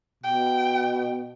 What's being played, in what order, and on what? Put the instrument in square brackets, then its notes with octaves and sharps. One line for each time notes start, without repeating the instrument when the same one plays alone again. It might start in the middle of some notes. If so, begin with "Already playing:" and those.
[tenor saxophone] B2 [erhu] G5